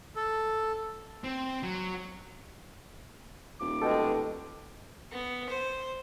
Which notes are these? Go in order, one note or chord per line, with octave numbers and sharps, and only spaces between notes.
A4
C4
F#3
D#1 D6
B2 G#3 A4 G5
B3
C5